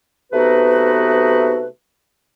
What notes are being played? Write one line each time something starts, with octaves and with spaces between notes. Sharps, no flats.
C3 A3 B3 D#4 F#4 B4